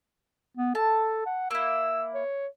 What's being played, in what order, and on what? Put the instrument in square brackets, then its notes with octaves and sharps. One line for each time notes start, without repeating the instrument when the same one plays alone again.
[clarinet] B3
[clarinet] A4 [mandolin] A5
[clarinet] F#5
[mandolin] A#3 E4 [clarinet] E6
[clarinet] C#5